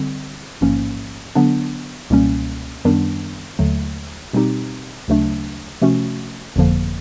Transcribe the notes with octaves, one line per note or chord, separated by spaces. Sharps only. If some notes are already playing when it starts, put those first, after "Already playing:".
Already playing: D3 G3 C4
A1 G#2 F3 A#3 C#4
D3 F#3 B3 D4
C#2 B2 G3 A#3 C#4
F#2 D#3 G3 B3 D4
D#2 D3 F#3 A3
B2 G3 C4 D#4 G4
D2 C#3 F#3 A3 D4
C3 F3 A3 C#4 F#4
G1 F2 D3 F3 A#3